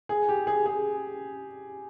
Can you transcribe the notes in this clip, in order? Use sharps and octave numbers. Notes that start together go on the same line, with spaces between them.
G#4
G4
G#4
G#4